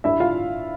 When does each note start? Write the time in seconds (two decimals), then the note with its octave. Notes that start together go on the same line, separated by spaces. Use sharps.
0.04 G2 E4 E5
0.20 F4 F5